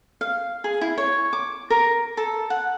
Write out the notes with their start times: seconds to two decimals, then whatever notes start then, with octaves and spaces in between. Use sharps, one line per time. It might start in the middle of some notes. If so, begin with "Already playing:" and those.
0.21 F5
0.64 G#4
0.81 E4
0.98 C#5
1.33 D6
1.70 A#4
2.17 A4
2.50 F#5